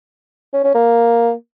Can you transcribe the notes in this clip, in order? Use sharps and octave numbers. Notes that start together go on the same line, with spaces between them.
C#4
C#4
A#3